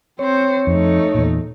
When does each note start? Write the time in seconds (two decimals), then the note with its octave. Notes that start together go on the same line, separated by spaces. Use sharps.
0.19 C4 C5 C#5
0.67 F2 A3 D#4
1.14 E2 A#2